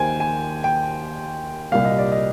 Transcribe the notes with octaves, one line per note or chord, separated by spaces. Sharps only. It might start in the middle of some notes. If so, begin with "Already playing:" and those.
Already playing: D#2 D#3 A#3 C5 G5 G#5
G#5
G5
C2 A#2 G3 A#3 F5
D#5
D5
D#5